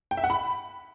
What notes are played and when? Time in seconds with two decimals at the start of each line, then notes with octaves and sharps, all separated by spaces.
0.11 G5
0.17 E5
0.24 F#5
0.30 B5